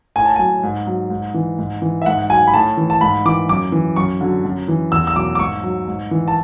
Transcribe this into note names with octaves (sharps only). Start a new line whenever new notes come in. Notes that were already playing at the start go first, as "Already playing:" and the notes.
A2 G#5
A5
F#3 G#5
G#2
F#3
G#2
E3
G#2
E3
E5
G#2 F#5
F#3 G#5
B5
A2 A5
E3
A5
G#2 B5
E3 D6
F#2 D6
E3
F#2 C#6
D3 F#3
F#2
E3
E2 E6
E6
B2 F#3 D6
D6
G#2 C#6
F#3
G#2
E3
A5